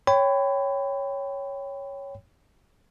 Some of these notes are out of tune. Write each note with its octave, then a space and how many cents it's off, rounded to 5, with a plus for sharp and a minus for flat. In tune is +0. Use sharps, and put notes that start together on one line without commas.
C#5 +0 G5 +0 B5 +30